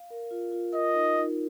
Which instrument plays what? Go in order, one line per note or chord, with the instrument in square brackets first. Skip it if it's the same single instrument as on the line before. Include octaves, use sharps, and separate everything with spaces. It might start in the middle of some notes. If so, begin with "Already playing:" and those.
Already playing: [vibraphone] F5
A#4
F4
F4
[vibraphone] A#4 [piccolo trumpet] D#5
[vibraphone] D#4
D#4